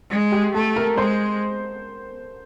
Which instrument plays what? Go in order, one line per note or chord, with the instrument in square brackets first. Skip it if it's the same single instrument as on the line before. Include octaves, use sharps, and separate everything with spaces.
[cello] G#3
[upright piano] G4 G5
[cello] A3 [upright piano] A4 A5
[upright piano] A#4 A#5
[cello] G#3 [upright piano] C5 C6